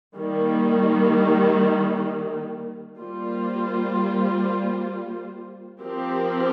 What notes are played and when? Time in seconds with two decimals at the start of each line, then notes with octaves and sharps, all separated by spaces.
0.17 D#3 G3 A#3
2.99 G3 A#3 F4 C5
5.81 F3 C4 G4 A#4